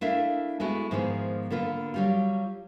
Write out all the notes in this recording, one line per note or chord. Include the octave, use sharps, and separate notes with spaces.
A3 D4 E4 A#4 E5 F5
G#3 A3 B3 E4 F#4
G#2 D#3 F3 G#3 B3
D3 A#3 B3 F4 B4
F#3 G3 F4